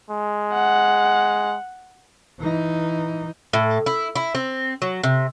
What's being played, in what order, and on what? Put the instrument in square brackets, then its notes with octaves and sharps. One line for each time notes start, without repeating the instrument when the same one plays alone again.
[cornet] G#3
[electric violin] F#5
[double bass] E3 D#4
[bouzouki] A2
E4
E4
C4
F#3
C3